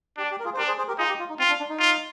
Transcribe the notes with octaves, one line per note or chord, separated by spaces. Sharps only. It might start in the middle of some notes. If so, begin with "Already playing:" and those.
D4 G4
G4
A#4
F4 G#4
C5
D4 G4 A#4
G#4 C5
G#4 C5
G4 A#4
D#4 F4 G#4
G4
F4
D#4
C4 F4
D4
D4
D#4
F4